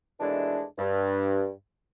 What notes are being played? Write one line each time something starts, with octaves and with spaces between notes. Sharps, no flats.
D#2 B2 E3 G#3 A3 D4
G2